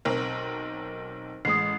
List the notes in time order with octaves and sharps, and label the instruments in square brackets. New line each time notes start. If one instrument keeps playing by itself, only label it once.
[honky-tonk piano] B1 C4 A#4
[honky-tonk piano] A1 G#3 [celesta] D#6 C7